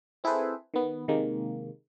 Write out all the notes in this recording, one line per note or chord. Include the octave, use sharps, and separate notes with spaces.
C4 E4 G#4 A4 B4 C5
D#3 B3
C3 D#3 G#3 A#3